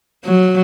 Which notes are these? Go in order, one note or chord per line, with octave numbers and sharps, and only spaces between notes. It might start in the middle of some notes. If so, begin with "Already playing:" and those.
F#3